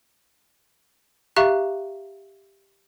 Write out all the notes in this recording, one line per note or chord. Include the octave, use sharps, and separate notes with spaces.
G4 E5 F5 A#5 C#6 F#6